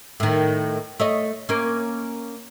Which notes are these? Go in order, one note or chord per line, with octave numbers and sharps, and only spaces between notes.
A2 D#3
A3 C#5 D#5
A#3 C#4